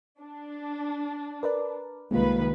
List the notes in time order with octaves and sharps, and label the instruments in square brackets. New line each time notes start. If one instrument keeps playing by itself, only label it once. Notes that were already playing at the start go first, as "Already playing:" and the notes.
[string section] D4
[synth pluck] A#4 B4 D5
[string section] C2 D#3 B4 [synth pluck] G#3 A#3 F4